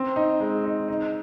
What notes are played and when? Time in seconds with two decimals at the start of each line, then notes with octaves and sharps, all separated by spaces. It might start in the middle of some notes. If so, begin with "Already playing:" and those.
Already playing: C4
0.16 D#4
0.40 G#3
0.65 D#4
0.88 D#4